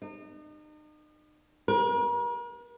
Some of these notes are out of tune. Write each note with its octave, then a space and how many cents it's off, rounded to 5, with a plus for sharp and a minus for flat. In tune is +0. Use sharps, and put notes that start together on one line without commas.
D#4 -40
A#4 +45